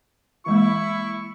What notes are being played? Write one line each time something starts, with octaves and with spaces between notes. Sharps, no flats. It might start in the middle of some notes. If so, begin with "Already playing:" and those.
E3 G#3 A#3 E4 C#6